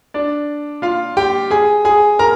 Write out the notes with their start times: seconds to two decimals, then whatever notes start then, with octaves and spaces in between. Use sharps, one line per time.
0.14 D4 D5
0.82 F4 F5
1.17 G4 G5
1.50 G#4 G#5
1.85 G#4 G#5
2.19 A#4 A#5